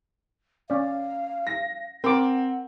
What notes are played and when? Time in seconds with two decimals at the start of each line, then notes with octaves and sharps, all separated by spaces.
0.70 C#4 D5 F5
1.47 A#6
2.04 C4 A#4 F#5 D6